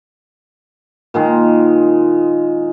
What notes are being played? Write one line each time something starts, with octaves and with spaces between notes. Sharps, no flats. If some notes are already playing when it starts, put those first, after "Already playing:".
A#2 D#3 G#3